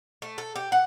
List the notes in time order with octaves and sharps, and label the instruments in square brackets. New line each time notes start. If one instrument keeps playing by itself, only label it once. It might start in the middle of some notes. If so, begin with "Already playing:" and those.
[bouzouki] A3
A4
G4
F#5